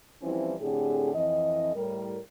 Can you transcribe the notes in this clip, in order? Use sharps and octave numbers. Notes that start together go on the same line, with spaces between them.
E3 F3 G3 C4 C#4 E4
A2 D3 C4 G4 G#4
F2 E3 D#5
A2 G3 A#4